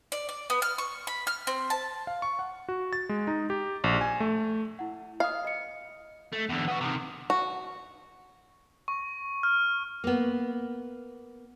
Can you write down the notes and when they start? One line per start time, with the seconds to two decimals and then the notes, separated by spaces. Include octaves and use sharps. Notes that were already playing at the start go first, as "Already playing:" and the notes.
0.12 D5
0.29 D5
0.50 B3
0.62 F6
0.78 C#6
1.07 B5
1.27 F6
1.47 C4
1.70 A5
2.07 F5
2.22 C#6
2.39 F#5
2.69 F#4
2.93 A6
3.09 G#3
3.27 D#4
3.50 G4
3.84 A#1
4.01 G#5
4.20 A3
4.79 E4 F#5
5.20 D#5 F5 D#6
5.45 D#5 C#7
6.33 A3
6.49 E2 D3
6.68 B3 F#4
6.81 C3 D#3
7.30 F#4
8.88 C#6
9.43 F6
10.04 A#3 B3